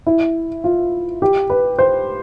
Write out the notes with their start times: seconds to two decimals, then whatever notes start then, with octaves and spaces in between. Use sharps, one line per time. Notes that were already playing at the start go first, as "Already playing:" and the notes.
0.07 E4
0.64 F4
1.22 G4
1.50 B4
1.79 C5